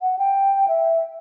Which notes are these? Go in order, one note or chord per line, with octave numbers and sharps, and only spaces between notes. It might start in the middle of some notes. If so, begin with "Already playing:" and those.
F#5
G5
E5